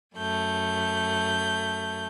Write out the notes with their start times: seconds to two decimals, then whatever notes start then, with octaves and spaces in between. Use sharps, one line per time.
0.17 F#2 A3 G6